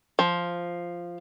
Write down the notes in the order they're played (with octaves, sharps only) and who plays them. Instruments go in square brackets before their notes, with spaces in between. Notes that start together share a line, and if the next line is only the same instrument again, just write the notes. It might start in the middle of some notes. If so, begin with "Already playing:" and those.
[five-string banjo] F3